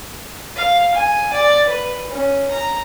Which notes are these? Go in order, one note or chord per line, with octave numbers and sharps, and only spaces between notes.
F5
G#5
D5
B4
C#4
A#5